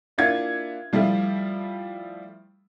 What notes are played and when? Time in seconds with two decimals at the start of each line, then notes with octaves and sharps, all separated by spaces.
0.18 A#3 D4 E4 F4 F#5 G#6
0.93 F3 G3 A3 E4 F4